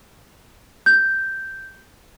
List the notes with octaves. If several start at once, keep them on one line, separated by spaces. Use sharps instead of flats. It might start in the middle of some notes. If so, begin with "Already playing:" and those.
G6